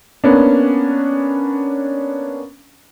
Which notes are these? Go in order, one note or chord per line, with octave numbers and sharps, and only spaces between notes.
A#3 B3 C#4 D4